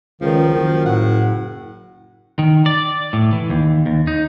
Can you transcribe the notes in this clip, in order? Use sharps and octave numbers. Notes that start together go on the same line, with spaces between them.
C#2 D#3 F3
F#1 D#3
A2 F#5
D#3
D5
A2
E3
D#2
D#2
D#4